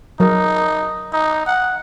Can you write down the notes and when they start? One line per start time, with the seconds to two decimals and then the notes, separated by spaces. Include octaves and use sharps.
0.20 F#3 D#4 A#4
1.12 D#4
1.46 F#5